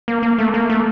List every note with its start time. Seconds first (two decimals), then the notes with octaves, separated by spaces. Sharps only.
0.08 A#3
0.23 A#3
0.39 A3
0.54 A#3
0.69 A3